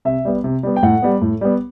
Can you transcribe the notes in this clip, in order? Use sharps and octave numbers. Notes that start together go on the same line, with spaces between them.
C3 E5
G3 B3
C3
G3 B3
G5
A2 F#5
G3 B3
A2
G3 B3